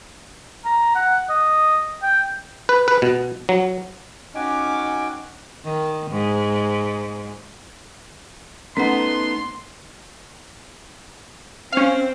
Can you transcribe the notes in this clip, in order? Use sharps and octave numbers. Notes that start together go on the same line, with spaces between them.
A#5
F#5
D#5
G5
B4
B4
B2
F#3
C#4 D#4 F#4 G5 G#5 D6
D#3
G#2
A3 B3 C#4 D#4 F#5 C6
C4 C#4 F5